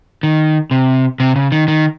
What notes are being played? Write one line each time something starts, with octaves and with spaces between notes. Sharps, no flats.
D#3
C3
C3
C#3
D#3
D#3